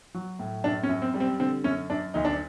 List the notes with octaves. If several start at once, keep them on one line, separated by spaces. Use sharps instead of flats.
F#3
A2
F#2 D4
C#4
F#2
C4
G3
C4
D3 C4
F#2 C#4
F#2 D4
D2 D#4
D4